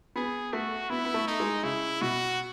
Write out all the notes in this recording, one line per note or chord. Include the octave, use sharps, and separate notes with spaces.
B3 G#4
A3 F#4
B3 E4
B3
A3
D#4
G#3
C#3 E4
B2 F#4